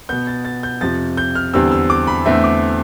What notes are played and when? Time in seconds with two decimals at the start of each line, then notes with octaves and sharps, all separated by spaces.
0.09 B2 B3 G6
0.27 A6
0.45 A6
0.63 G6
0.81 F2 C3 F3 A6
1.17 G6
1.35 F6
1.53 E2 D3 G3 C4 E6
1.72 E6
1.90 D6
2.07 B5
2.25 E2 D3 A3 C4 E5
2.44 D6